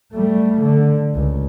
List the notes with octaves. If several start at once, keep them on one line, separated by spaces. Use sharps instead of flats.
G3 A3
D3
C#2